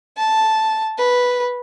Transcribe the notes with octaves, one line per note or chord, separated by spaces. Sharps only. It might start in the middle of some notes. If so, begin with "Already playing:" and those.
A5
B4